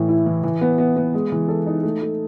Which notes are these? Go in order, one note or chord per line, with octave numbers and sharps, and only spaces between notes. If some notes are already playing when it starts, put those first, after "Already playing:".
Already playing: A2 E3
E4
E3
E3
B3
B3
B3
G#3
E3
A4
D#4
A3
A3